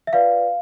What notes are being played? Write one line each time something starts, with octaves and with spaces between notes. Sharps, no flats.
E5
F4 B4 D5 F5